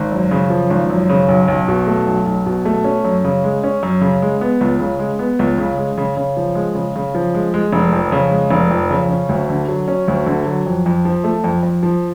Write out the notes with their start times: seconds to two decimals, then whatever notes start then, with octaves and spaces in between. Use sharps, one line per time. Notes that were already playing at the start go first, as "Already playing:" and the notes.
Already playing: G#1
0.12 F#2
0.31 C#3
0.50 F3
0.70 G#1
0.90 F#2
1.09 C#3
1.29 B1
1.48 B1
1.68 B2
1.87 A3
2.06 B1
2.26 B1
2.46 B2
2.65 A3
2.84 C#4
3.05 F#2
3.24 C#3
3.44 G#3
3.64 C#4
3.83 F#2
4.01 C#3
4.22 G#3
4.41 B3
4.61 C#2
4.80 C#3
4.99 G#3
5.19 B3
5.39 C#2
5.58 C#3
5.78 G#3
5.98 C#3
6.17 C#3
6.37 F3
6.55 G#3
6.75 C#3
6.96 C#3
7.15 F3
7.35 G#3
7.54 G#3
7.73 F1
7.92 F2
8.12 C#3
8.31 G#3
8.51 F1
8.71 F2
8.90 C#3
9.09 C#4
9.29 D2
9.49 D3
9.69 F#3
9.88 C#4
10.08 D2
10.26 D3
10.46 F#3
10.66 F2
10.86 F2
11.05 F3
11.24 A3
11.44 F2
11.63 F2
11.83 F3